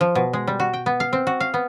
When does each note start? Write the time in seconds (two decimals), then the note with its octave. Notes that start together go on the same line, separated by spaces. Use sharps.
0.01 F3
0.15 B2
0.33 G#3
0.47 G3
0.60 F#4
0.73 G5
0.86 B3
1.00 F5
1.13 C4
1.27 F#4
1.40 F5
1.54 B3